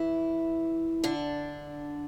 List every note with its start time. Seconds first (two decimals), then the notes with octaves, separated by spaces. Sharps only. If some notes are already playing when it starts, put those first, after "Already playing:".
Already playing: E3 E4
1.04 D3 D4